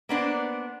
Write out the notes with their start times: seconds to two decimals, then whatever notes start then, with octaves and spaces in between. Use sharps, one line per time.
0.09 A#3 B3 D4 C5